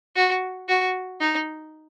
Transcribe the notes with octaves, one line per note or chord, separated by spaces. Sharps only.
F#4
F#4
D#4